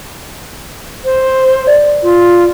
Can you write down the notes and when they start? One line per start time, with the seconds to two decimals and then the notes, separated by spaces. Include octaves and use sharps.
1.05 C5
1.67 D5
2.03 F4